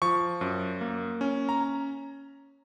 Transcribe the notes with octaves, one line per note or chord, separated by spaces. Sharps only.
F3 C#6
F#2
A#3
C#4
A#5